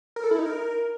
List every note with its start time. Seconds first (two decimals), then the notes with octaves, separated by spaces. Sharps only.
0.16 A#4
0.24 A4
0.31 E4
0.38 D#4
0.46 A#4